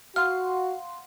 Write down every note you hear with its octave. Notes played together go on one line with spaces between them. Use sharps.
F#4 F5 F#5 C6 F6